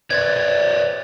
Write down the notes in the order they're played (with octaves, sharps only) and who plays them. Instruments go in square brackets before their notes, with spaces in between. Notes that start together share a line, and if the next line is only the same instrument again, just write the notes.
[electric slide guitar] B4 C#5 D5 [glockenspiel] G#6 A6